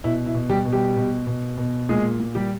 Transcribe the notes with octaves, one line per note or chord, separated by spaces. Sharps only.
B2 E4
E4
B2
G3 G4
B2
G3 G4
B2
B2
B2
A#2 G#3 G#4
A#2
G3 G4